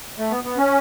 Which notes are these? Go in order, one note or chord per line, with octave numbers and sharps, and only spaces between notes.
A3
B3
B3
C#4